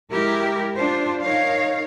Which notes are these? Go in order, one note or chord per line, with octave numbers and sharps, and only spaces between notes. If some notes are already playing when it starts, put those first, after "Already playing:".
G#3 E4 G4 A#4
D4 F4 C5
D#4 A#4 C#5 F5